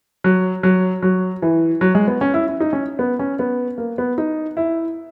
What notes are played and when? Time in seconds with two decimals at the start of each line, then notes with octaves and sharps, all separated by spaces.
0.24 F#3
0.63 F#3
1.02 F#3
1.42 E3
1.81 F#3
1.95 G#3
2.07 B3
2.21 C#4
2.34 E4
2.47 E4
2.60 D#4
2.73 C#4
2.99 B3
3.19 C#4
3.39 B3
3.78 A#3
3.98 B3
4.18 D#4
4.57 E4